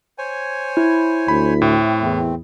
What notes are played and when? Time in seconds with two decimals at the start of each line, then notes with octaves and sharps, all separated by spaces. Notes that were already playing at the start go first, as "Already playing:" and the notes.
0.18 C5 C#5 G#5
0.77 E4
1.28 D2 B5
1.62 A2 A3 C4
2.02 E2